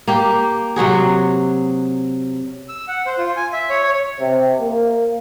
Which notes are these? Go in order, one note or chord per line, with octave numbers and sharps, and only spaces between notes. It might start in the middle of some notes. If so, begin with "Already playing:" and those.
A#3 G4
C3 F#3 F#4 G#4
E6
F#5
C5
F4
G#5
E5
C#5
C#5
C3
A#3